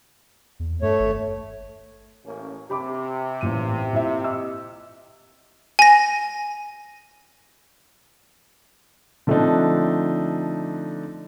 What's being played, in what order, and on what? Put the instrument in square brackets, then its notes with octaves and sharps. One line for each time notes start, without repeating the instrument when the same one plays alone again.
[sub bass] E2
[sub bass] G2 [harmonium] A3 C#5
[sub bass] G#1
[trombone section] A1 A#3 C#4
[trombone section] C3 [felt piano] G4 B5 D6
[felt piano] A1 A#2 D#7
A#2 E4 E5
D#5 E6
[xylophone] G#5 A#6
[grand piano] D3 F3 A3 C4 D4 D#4